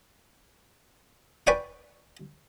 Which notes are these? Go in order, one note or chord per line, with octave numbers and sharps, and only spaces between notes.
B4 D5 G5 G#5 C#6